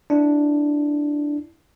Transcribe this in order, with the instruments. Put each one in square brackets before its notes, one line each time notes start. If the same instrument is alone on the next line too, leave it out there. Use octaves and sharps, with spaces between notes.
[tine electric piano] D4 E4